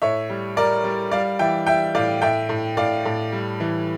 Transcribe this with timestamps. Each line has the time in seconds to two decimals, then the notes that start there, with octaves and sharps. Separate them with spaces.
0.02 A2 C#5 E5
0.30 G3
0.56 G3 A#4 D5
0.84 G3
1.11 G3 D5 F5
1.39 E3 E5 G5
1.66 G3 E5 G5
1.95 A2 D5 F5
2.22 A2 E5 G5
2.49 A2
2.77 A2 D5 F5
3.05 A2
3.32 G3
3.60 E3